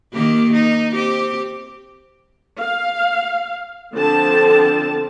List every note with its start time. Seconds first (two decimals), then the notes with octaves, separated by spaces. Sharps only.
0.13 D#3 A#3 G4
0.53 D#4
0.94 C4 G4
2.60 F5
3.93 D3 F3 C4 A5